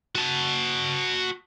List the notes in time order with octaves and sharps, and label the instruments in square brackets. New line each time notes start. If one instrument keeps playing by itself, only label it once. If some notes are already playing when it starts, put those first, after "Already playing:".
[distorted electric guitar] F#4 A5